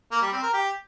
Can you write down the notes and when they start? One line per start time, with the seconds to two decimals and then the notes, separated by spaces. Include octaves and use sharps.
0.11 A#3
0.22 G3
0.32 C4
0.43 A#4
0.53 G4